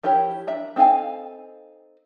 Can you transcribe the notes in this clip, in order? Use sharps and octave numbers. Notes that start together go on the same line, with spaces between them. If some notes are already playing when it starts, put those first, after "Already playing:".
F3 E4 G4 A#4 C#5
D4 E5 A#5
C4 D#4 A4 F5 G#5